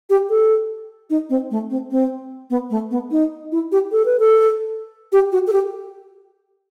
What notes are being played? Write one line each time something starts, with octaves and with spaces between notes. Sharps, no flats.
G4
A4
D#4
C4
A3
C4
C4
B3
A3
B3
D#4
E4
G4
A4
B4
A4
G4
F#4
A4
G4